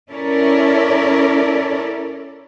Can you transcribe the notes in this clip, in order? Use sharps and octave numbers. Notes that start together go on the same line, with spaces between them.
C#4 E4 A4 A#4 D5